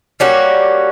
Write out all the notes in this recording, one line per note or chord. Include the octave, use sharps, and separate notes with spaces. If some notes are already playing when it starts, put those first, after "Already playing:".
G3 A#3 C#4 F#4